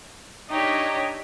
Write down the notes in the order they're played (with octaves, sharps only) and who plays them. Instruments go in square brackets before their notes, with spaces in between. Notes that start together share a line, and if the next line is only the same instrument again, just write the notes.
[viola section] D4 C#5 D#5 [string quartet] D#4 G4 E5